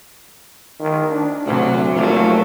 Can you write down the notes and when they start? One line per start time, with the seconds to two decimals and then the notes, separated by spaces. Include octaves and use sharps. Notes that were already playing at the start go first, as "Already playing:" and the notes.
0.79 D#3
1.11 D4
1.46 D2 C3 F#3
1.95 F1 F#3 A3 A#3